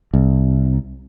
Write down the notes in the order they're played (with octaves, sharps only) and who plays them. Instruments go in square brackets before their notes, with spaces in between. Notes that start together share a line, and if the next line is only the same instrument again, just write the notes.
[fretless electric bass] C2